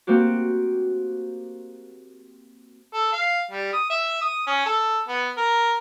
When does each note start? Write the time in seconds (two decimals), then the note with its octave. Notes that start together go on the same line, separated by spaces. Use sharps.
0.07 A#3 C4 F#4 G4
2.94 A4
3.13 F5
3.51 G3
3.73 D#6
3.90 E5
4.21 D#6
4.47 C#4
4.66 A4
5.08 B3
5.37 A#4